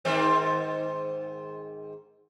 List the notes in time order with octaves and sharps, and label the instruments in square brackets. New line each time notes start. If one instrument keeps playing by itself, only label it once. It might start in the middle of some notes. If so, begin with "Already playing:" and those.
[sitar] G#2 D#3 C4